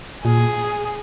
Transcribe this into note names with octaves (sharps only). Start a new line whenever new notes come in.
A#2 G#4